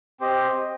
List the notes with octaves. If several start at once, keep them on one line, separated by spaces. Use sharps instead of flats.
C4 G4 C5 D#5